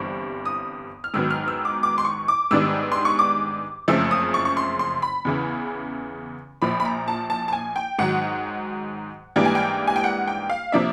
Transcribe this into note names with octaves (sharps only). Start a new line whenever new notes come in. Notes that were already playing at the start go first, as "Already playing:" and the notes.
Already playing: G1 G2 E3 G3 C4 C#6
D#6
F6
G#2 D#3 F#3 B3 E6
F6
E6
D6
D6
C6
C#6
D6
G#2 D#3 G3 B3 D4 E6
C6
C#6
D6
F#1 F2 C#3 F3 A3 E6
D#6
C#6
C#6
C6
C6
B5
E2 C#3 E3
A#1 A#2 F3 B5
B5
A#5
A5
A5
A5
G#5
G5
G#2 D#3 F#3 F#5
G#2 E3 G3 A#3 D4 G5
G#5
G5
G#5
G5
F#5
G5
F5
C3 F3 A#3 D4 E5